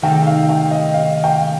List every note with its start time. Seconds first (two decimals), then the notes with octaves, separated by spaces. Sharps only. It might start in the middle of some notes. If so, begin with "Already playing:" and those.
0.02 C3 D#3 A3 D#4 A4 G5
0.27 F5
0.49 G5
0.71 D#5
0.94 F5
1.24 G5